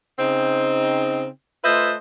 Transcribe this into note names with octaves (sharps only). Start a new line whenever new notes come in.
C#3 C4 D#4
A3 F4 B4 C5 D#5 E5